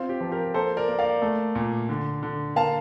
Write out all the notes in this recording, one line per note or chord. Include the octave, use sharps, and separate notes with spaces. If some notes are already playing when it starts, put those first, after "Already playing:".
Already playing: C4 F4
G4
F3
G4 A#4
A#3 A4 C5
A#4 D5
A#3
D5 F5
A3
A#2
D3
D3
A#3 F5 A5